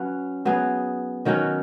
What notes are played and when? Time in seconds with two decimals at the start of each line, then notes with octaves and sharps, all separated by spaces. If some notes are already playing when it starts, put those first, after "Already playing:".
Already playing: F#3 C#4 B4
0.45 F#3 B3 G#4
1.25 D#3 F#3 C#4 F#4